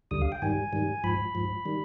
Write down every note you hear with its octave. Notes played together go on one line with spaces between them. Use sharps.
D2 D3 G3 D#6
F5
G5
G#2 D#3 G3 G#5
G#2 D#3 G3
G#2 F3 B5
G#2 F3
D#3 G3